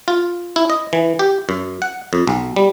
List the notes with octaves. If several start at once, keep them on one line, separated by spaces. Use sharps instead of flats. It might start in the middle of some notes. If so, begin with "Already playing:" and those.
F4
E4
D#5
E3
G4
F#2
F#5
F2
B1
G3